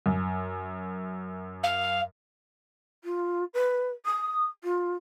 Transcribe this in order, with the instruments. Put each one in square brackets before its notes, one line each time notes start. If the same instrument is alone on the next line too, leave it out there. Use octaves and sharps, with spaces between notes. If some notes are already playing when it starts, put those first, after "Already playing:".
[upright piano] F#2
[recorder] F5
[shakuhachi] F4
B4
D#6
F4